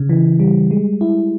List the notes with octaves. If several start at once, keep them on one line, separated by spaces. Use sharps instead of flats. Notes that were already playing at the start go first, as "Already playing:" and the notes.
Already playing: C#3
E3
G3
G#3
E4